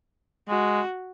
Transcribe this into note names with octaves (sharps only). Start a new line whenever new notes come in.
G#3 F#4